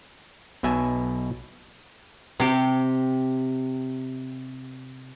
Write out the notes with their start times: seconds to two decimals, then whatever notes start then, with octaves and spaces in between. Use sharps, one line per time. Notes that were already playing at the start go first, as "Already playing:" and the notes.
0.63 B1 B2 E5 G#5
2.40 C3 G4